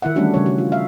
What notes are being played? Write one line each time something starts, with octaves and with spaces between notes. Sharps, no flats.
D#3 E4 E5 F#5
E3 G3 A3 C#4 D4 F#4
C#3 G3 C#5
F#4
F4
E5 F5